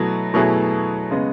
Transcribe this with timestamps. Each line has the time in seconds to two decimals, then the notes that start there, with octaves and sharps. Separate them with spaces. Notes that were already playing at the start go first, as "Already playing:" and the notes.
Already playing: B2 F#3 A3 E4
0.34 B2 F#3 A3 E4 G#4
1.11 C#3 G#3 B3